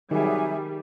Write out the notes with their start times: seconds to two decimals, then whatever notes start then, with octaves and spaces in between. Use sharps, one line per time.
0.11 C3 D#3 F#3 G3 G#4 E5 G#5